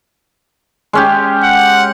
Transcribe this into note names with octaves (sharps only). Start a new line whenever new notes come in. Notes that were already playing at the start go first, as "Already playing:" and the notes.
G#3 C#4 G4
F#5